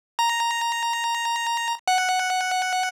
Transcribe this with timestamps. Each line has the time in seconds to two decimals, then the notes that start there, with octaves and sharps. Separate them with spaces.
0.19 A#5
1.88 F#5